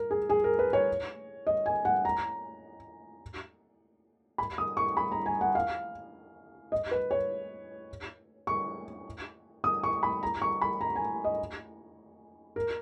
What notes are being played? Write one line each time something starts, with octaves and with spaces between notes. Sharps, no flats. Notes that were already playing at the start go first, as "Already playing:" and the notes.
Already playing: A#4
G#4
G#4
A#4
B4
C#5
D#5
G#5
F#5
A#5
B5
D#6
C#6
B5
A#5
G#5
F#5
F5
D#5
B4
C#5
C#6
D#6
C#6
B5
A#5
C#6
B5
A#5
G#5
D#5
A#4